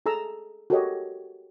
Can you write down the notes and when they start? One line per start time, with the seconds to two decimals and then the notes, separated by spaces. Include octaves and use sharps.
0.06 G#4 A4 A#5 E6
0.70 F#4 G4 A4 A#4 C#5 D#5